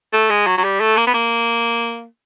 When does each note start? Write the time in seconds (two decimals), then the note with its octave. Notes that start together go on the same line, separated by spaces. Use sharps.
0.13 A3
0.30 G#3
0.47 F#3
0.58 F#3
0.64 G3
0.80 A3
0.97 A#3
1.07 B3
1.14 A#3